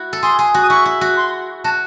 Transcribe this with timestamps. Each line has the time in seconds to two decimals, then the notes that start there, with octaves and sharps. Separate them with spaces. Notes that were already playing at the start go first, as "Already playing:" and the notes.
Already playing: E4 F#4
0.13 A4
0.23 G#4 C6
0.39 G#4
0.54 F#4
0.63 D#6
0.70 E4 C#6
0.86 E4
1.01 F#4
1.17 C6
1.64 F#4 A5